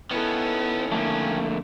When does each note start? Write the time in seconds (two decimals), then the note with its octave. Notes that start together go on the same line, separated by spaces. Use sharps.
0.11 D#3 B3 C#4 E4 A4
0.92 F2 D3 A3 A#3